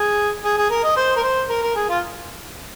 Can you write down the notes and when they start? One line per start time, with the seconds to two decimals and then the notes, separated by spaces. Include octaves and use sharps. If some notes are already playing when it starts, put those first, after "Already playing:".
Already playing: G#4
0.44 G#4
0.58 G#4
0.70 A#4
0.84 D#5
0.96 C5
1.16 A#4
1.23 C5
1.49 A#4
1.63 A#4
1.76 G#4
1.89 F4